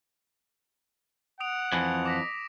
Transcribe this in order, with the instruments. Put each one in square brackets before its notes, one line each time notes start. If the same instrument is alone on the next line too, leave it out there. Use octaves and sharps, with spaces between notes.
[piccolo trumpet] F#5 [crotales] D#6 D7 F7
[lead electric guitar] F2 E3
[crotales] D6 A#6 B6